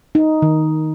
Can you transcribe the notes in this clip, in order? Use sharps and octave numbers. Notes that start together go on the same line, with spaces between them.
D#4
D#3